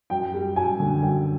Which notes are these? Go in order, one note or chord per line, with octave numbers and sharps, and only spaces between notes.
F#2 G5
G3
F#2 G#5
D3
F#2 G5